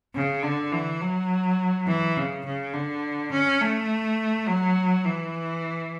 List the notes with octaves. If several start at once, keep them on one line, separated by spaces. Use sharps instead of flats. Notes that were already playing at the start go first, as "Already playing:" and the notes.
C#3
D3
E3
F#3
E3
C#3
C#3
D3
C#4
A3
F#3
E3